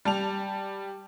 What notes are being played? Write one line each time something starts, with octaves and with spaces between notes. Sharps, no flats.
G3 A5 F7